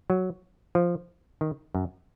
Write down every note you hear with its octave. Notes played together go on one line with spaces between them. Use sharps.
F#3
F3
D#3
F#2